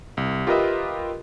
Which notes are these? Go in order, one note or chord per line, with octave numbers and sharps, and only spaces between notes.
C2
F4 G4 A#4 B4 D#5 E5